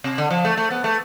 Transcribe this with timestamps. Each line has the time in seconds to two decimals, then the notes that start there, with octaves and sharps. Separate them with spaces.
0.04 C3
0.18 D3
0.30 F3
0.45 A3
0.57 A3
0.70 B3
0.84 A3